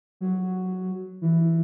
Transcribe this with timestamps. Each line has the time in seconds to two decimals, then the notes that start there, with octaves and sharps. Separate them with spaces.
0.21 F#3
1.21 E3